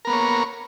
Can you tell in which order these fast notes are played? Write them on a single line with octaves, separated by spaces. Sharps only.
A#4 B3 A#3 C#5